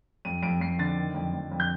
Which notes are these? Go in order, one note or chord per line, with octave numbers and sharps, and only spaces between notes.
F2 D#7
F2 D7
F2 C7
D3 A6
D#3
F2
F2
F2
G6